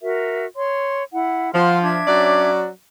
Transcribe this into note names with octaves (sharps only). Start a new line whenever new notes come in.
F#4 A#4 E5
C#5 C6
E4 F#5
F3 F#5 C6 F6
D4 E5 G#6
F#3 C#4 D5